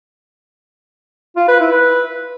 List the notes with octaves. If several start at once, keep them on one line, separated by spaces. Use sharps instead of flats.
F4
B4
E4
B4